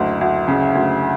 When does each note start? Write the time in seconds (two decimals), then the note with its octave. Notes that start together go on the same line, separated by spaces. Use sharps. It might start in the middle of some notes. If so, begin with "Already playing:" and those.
Already playing: F#1 D2
0.21 D2
0.48 C#3
0.75 D2